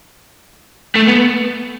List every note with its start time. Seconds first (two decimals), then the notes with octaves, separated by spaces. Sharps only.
0.96 A3
1.08 B3